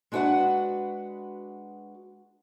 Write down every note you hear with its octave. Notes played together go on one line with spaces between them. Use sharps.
G#3 D4 F#4 B4 F#5